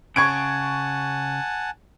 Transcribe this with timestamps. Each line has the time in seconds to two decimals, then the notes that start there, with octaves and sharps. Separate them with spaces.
0.16 C#3 F#5 G#5 A5 C#6 G#6 D7